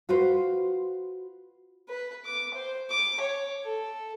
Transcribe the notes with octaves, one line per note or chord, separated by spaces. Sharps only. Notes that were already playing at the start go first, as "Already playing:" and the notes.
F4 F#4 B4 C5
B4
D6
C5
D6
C#5
A4